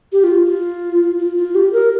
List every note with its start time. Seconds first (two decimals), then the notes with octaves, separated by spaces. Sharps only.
0.12 G4
0.24 F4
0.46 F4
1.18 F4
1.37 F4
1.55 G4
1.73 A#4